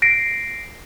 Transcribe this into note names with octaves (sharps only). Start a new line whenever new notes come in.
A#6 C7 D7